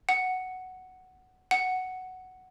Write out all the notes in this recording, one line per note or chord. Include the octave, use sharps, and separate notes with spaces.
F#5
F#5